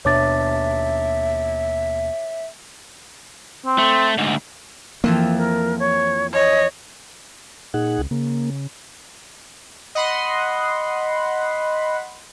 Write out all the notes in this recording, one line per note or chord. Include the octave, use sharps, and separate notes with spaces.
D#2 B2 D4 C#5 E5 D6 A6
C4
A3
D2 G#2
F2 E3 F3 A#3
A#4
C#5
C#5 D#5
A#2 D#4 G#4 F#5
C#2
C#3 A#3
D#5 F#5 B5 C6